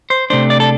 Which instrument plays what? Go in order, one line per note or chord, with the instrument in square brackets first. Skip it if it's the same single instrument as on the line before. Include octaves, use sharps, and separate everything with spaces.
[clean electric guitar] C5
C3 A3 D4 C5
D5
A4